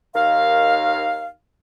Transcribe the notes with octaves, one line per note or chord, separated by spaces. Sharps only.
D#2 D#3 F5